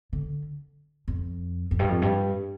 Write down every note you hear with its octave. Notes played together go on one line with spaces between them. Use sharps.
D3
F2
F2
G2
F2
G2